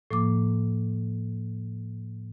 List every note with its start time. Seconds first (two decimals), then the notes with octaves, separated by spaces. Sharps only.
0.11 A2 F3 A#3 D6